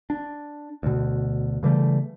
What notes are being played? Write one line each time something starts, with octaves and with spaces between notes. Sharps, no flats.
D4
D2 B2
C#3 E3 G3 A3